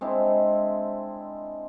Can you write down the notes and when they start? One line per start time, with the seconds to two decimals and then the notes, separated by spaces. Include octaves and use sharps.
0.01 G#3 C4 D4 E4